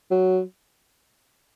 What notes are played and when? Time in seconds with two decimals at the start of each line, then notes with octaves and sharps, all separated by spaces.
0.11 F#3